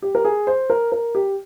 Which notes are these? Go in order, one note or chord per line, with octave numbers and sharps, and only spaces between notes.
G4
A#4
G#4
C5
A#4
A#4
G4